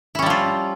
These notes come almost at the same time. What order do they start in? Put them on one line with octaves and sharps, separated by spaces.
E4 C#4 G3 F3 F4